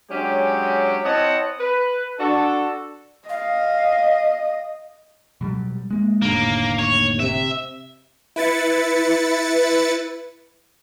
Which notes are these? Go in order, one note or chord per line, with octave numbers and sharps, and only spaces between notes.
F#3 G#3 C#4 D4 G4
C4 E4 C#5 D#5 F#5 A5
B4
D4 F#4 A4
D#5 F5
B2 F#3 G3
G#3 A#3
F1 D#2 A2 D3 A#3
C#5
C3 E5
E4 B4 A6 C#7